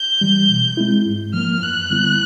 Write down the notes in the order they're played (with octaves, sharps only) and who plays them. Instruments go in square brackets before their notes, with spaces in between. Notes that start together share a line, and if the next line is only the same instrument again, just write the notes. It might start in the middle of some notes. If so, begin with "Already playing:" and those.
Already playing: [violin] G6
[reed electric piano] E3 G3
B2
G#3 C4 E4
G#2
[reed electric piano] F3 A#3 [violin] F6
[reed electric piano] F#2 [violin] F#6
[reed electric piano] D3 G3 B3 E4